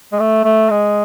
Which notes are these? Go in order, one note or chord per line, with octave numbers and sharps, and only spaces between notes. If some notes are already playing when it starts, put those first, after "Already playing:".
G#3
A3
A3
G#3